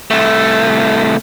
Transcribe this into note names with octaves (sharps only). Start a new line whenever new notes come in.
C2 A3